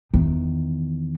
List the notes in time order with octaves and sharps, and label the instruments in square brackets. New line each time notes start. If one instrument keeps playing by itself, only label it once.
[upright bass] E2 D#3